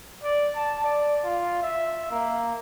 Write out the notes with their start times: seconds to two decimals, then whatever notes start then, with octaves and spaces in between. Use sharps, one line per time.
0.23 D5
0.56 A5
0.84 D5
1.25 F4
1.62 E5
2.11 A#3